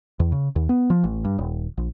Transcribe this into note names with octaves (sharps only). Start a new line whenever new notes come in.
E2
C#3
D#2
B3
F3
A1
G2
D#1
A#1